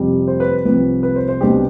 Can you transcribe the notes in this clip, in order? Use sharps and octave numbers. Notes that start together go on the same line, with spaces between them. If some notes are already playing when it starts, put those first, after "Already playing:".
Already playing: F2 C3 G3
C5
B4
C2 C3 F3 B4
B4
C5
C5
C2 B2 B3 D4 G4